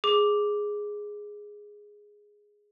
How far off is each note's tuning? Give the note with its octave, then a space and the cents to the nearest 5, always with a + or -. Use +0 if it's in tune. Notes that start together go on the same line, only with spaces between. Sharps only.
G#4 +0 D6 +0